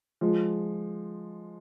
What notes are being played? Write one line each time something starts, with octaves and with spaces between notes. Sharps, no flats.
F3 G#3